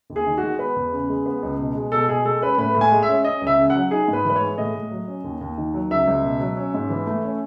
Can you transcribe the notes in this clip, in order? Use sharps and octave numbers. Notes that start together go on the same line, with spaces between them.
D#2
G#4
D#3
F#4
G#3
B3 B4
E2
C#3
G#3
B3
C#2
B2
G#3
B2 A4
B2 G#4
G#3 A4
C#4 B4
A2 B4
A2
G#5
G#3
E5
C#4
C#4 D#5
C#2 E5
C#3
F#5
F#3
D#4 G#4
G#2
B4
E3 B4
C#5
G#3
A2 D#5
A2
F#3
C#4
D#2
D#2
D#3
F#3
C#2 E5
C#2
B2
F#3
C#4
G#2
E3
A3
C#4